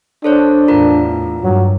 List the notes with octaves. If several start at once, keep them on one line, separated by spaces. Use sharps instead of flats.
D4 A4 C5 C#5
E2 A2 F4 A#4 A#5
G2 F#3